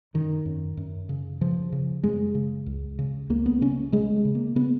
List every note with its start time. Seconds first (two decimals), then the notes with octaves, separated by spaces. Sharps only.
0.14 F#2 D#3
0.46 F#2
0.77 F#2
1.09 C#3
1.41 C#3 F3
1.72 C#3
2.03 F#2 G#3
2.35 C#3
2.66 C#2
2.99 C#3
3.30 C#2 A#3
3.46 B3
3.61 C#3 C#4
3.92 C#3 G#3
4.25 C#3
4.35 A#3
4.56 C#3 B3